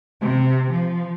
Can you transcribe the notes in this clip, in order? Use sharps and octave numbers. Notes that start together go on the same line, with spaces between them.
C3
F3